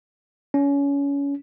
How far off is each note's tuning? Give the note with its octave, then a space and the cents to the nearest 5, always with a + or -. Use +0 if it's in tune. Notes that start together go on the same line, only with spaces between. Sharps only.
C#4 +25